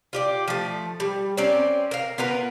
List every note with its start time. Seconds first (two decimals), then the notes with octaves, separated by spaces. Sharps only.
0.13 F4 G4 D5
0.48 F3 A3
1.00 G3
1.37 C4 C#4 A#4 D5
1.91 A#4 F5
2.18 B3 F4 A#4 B4